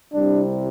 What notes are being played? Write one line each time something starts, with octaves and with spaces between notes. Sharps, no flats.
C2 C3 G3 D4